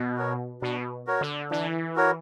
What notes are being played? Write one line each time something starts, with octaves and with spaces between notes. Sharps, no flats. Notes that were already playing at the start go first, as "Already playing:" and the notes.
Already playing: B2
F#4 A#4 C#5
B2 D4
F#4 A#4 C#5
D3
E3 D4
F#4 A#4 C#5